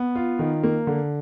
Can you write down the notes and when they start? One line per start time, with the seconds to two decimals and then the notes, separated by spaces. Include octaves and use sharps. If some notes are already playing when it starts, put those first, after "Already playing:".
Already playing: B3
0.15 F4
0.39 D#3
0.63 A#3
0.87 D3